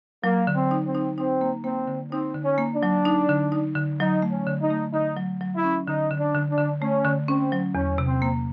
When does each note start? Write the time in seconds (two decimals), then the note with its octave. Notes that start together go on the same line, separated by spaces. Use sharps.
0.24 F#3 A#3
0.47 D3
0.55 C4
0.71 D#4
0.87 C4
0.95 D#4
1.18 C4 D#4
1.41 A#3
1.64 A#3 C4
1.88 D3
2.12 C4 D#4
2.35 D3
2.43 C#4
2.58 A#3
2.74 D4
2.83 F#3
3.05 D#4
3.29 D3
3.52 D#4
3.76 D3
4.00 F#3 D#4
4.22 A3
4.31 C#4
4.47 D3
4.62 D#4
4.70 A3
4.93 D3 D#4
5.17 F#3
5.41 F#3
5.56 E4
5.64 C#4
5.88 D3 D#4
6.11 D3
6.19 D4
6.35 D3
6.50 D4
6.58 D3
6.81 A3 C#4
7.05 D3
7.28 C4 C#4
7.52 F#3
7.75 E2 C#4
7.98 C3
8.07 C4
8.22 A#3